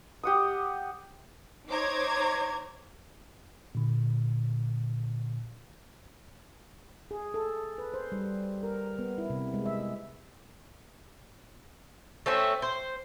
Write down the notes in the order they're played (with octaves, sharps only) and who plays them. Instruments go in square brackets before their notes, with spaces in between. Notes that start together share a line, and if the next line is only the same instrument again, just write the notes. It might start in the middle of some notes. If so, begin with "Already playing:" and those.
[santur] G4 F#5 D#6
[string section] D#4 C5 C#5 A#5 D6 G#6
[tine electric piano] A#2 D3
[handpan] G#4
A4
B4
C5
G3
A#4
B3
E4
C3
G#3
E5
[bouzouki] A3 C4 C#4 E5
C5